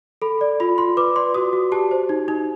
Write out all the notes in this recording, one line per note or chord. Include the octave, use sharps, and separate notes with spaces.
A4 B5
D5
F4 B5
F4 C6
B4 D6
D5 C6
F#4 D#6
F#4
G4 A5
C5
D#4
D#4